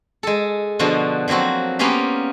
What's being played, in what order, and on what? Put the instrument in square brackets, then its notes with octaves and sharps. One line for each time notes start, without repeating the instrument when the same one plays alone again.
[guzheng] G#3 A4
B2 D3 F3 F#4
F3 F#3 A#3 C4 F#4
A#3 B3 C#4 F4 G4 F5